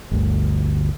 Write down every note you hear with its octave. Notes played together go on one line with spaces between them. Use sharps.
G1 D2